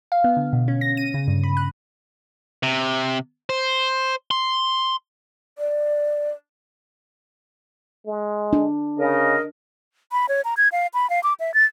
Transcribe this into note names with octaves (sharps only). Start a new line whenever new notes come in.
F5
B3
D3
B2
C#4
A#6
D#7
C#3
G2
B5
F#6
C3
C5
C6
D5
G#3
D4
C#3 A#4 D#5
B5
C#5
A#5
G#6
F5
B5
F5
D6
E5
A6